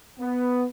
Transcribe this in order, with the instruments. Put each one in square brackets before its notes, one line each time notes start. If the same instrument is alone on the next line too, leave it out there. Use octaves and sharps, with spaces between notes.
[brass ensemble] B3